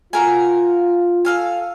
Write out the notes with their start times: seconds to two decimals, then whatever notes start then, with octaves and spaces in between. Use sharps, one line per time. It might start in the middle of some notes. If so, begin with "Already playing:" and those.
0.13 F4 F#4 A#4 G#5
1.25 A4 F5 G#5